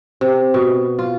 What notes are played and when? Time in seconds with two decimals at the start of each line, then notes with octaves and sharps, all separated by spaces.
0.21 C3
0.54 B2
0.99 F4